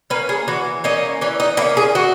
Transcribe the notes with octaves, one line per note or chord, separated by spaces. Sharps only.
A#3 C#4 B4
G#4
E3 F#4
A#3 C#4 D#4
E3 C#4
D#4
A#3 C#4 E4
G#4
E3 F#4